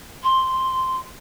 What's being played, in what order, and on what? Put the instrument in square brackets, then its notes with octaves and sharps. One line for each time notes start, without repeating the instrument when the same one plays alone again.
[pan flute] C6